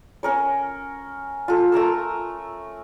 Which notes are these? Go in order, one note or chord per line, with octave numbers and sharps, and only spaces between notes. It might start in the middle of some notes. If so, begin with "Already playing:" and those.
C#4 A#4 C#5
F4 A4
A3 A#4 A#5 E6